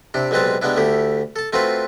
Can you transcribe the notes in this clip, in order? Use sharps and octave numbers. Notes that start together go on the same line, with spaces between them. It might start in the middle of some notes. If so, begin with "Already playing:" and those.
C3 D4 E4
B1 G3 G#3 C4 B4 A5
G3 G#3 B3 D4 E4
D2 A3 E4 G4
A4 A5
A3 C4 F4 F#4 B4